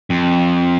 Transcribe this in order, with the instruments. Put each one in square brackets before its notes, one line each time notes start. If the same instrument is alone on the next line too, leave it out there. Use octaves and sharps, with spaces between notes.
[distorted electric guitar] F2